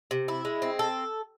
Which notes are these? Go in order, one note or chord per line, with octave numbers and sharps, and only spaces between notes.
C3
E4
G#3
C4
A4